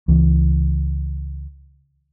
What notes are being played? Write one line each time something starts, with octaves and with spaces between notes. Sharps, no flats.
C#2 E3